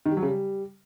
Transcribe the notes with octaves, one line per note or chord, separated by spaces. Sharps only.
D#3
G3
F#3
C#3
G3